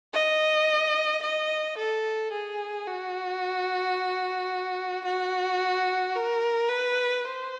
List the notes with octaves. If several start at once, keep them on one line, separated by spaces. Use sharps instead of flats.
D#5
D#5
A4
G#4
F#4
F#4
A#4
B4
C5